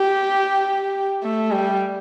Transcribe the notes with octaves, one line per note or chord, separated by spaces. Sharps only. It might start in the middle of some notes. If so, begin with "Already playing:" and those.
Already playing: G4
A3
G3